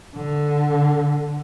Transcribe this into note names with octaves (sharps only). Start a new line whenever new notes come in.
D3